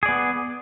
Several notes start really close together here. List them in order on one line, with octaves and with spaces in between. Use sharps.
G#4 D5 B3